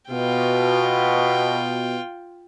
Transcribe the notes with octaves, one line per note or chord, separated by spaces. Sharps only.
B2 F4 G5